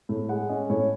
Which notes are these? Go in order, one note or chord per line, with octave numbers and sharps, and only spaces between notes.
A2
G#3 F#5
C#4 D#5
A2 C#5